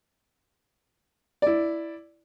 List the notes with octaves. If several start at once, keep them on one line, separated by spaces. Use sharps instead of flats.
E4 D5